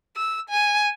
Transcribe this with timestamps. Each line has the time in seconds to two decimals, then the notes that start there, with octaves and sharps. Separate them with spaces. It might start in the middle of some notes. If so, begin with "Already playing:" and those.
0.16 E6
0.49 G#5